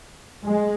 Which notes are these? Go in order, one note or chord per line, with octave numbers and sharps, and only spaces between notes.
G#3